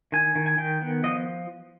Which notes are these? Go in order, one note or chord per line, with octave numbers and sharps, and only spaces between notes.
D#3 G#5
D#3
G#5
D#3 G5
B3
F3 D#5